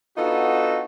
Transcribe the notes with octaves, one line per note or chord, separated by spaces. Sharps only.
B3 D4 D#4 F4 F#4 A4